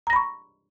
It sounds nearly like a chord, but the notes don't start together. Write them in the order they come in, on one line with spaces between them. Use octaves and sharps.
A#5 A#6 B5 C#6